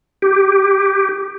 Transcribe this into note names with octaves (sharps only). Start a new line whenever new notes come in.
G4